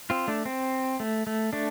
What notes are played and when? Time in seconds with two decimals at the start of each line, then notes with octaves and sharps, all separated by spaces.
0.10 C4 F4
0.28 A3 D4
0.46 C4
1.00 A3
1.27 A3
1.53 A3 D4